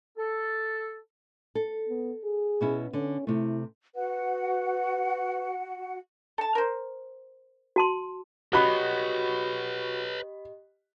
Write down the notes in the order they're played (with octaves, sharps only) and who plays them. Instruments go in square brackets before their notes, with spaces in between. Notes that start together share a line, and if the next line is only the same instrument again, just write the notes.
[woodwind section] A4
[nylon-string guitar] A4
[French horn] B3
G#4
[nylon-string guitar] B2 C#4 E4
[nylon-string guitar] D3 [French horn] C#4
[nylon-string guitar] C3 A3 [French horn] E4
[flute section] F#4 F#5 [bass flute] B4
[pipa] A4 A5
A#4 C5
[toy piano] F#4 A5 C6
[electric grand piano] F#4 [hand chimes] G4 D#5 [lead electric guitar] B4 C#5 [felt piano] B5 F#6